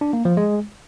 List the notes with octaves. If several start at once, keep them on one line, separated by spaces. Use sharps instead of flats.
D4
A#3
F3
G#3